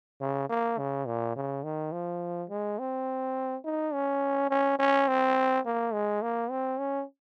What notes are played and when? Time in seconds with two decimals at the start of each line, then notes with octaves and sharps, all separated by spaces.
0.21 C#3
0.49 A#3
0.79 C#3
1.06 A#2
1.36 C#3
1.64 D#3
1.92 F3
2.50 G#3
2.79 C4
3.65 D#4
3.94 C#4
4.50 C#4
4.79 C#4
5.08 C4
5.66 A#3
5.93 G#3
6.22 A#3
6.50 C4
6.79 C#4